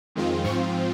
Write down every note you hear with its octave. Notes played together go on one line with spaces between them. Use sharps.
F2 D#3 G#3 C4 F4
G#2 F3 C4 F4 C#6